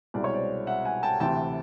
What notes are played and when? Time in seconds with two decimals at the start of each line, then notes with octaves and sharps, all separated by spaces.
0.14 C2 B2 G#3 D5
0.24 C#5
0.34 C5 D5
0.67 E5 F#5
0.85 F#5 G#5
1.03 G5 A5
1.20 D2 C3 E3 G5 A5